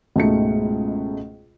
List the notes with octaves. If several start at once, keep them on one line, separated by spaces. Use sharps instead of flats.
C#2 G#2 B2 A3 D#4 C#7